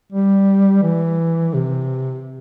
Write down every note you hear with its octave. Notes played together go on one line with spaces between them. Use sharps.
G3
E3
C3